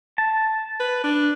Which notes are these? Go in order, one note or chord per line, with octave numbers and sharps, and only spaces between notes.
A5
B4
D4